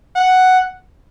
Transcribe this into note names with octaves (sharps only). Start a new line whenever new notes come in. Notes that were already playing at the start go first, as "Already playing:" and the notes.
F#5